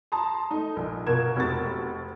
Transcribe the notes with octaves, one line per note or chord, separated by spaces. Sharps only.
A5 A#5 C6 D#6
A3 D#4
A#1
B2 F4 A#4 G#6 E7
F1 C4 F#4 C#6 A6